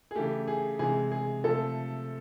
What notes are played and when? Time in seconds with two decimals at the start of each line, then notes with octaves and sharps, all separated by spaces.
0.11 G#4
0.15 C#3 E3 A3 G4
0.48 G#4
0.79 C3 E3 G#3 G#4
1.11 G#4
1.44 C3 F3 A3 A4